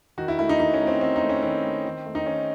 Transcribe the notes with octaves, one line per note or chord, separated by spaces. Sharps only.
D#3 F#4
E4
A3 E4
D#4
D#3 D#4
C#4
A3
C4
D#3 C4
D#4
A3
C#4
D#3 C4
A3
D#3
A3
D#4
D#3 C#4